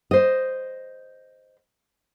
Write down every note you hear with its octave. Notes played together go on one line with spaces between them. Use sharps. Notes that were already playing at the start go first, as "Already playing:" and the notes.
C5 D#5